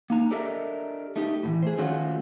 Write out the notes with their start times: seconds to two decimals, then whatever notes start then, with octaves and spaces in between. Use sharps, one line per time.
0.10 A#3 D#4 A#5
0.31 D4 G4 A4 A#4 D#5 E5
1.16 A3 D#4 G4
1.43 A2 C#3 E3
1.63 G#4 C5
1.77 D#3 F3 A3 C#4 F4 F#4